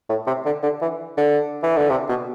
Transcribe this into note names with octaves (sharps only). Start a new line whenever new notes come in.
A2
C3
D3
D3
E3
D3
E3
D3
C3
B2